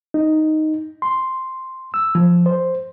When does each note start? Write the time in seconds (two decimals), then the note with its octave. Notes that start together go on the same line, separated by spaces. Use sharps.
0.14 D#4
1.02 C6
1.94 E6
2.15 F3
2.46 C5